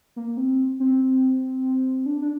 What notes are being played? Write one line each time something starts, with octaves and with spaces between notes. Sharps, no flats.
A#3
C4
C4
D4
D4